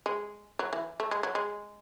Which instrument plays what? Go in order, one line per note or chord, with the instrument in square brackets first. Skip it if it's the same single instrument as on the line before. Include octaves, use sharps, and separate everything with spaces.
[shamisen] G#3
F#3
E3
A3
G#3
F#3
G#3